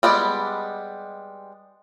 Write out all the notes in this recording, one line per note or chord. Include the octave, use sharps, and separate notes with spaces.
G3 G#3 B3 D5